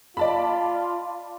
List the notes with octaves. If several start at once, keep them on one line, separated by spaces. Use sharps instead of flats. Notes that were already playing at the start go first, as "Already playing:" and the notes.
F4 D5 A5 B5